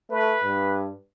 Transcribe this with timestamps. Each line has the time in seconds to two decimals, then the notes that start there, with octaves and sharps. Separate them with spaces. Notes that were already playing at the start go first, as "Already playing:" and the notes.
0.11 A3 B4
0.44 G2